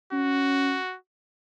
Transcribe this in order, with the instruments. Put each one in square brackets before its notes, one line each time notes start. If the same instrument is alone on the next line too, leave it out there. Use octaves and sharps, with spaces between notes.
[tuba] C#4 [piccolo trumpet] F#4